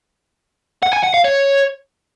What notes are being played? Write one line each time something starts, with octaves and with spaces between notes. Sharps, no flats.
F#5
G#5
F#5
F5
C#5